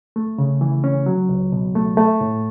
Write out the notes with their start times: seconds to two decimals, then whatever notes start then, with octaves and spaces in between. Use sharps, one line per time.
0.16 A3
0.38 C#3
0.61 E3
0.84 C#4
1.06 F#3
1.29 C#2
1.52 B2
1.75 A3
1.97 A3
2.21 A2